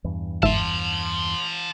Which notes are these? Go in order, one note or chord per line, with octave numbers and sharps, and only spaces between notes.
E2 G2 E3
G1 G#2 E5 A5 C6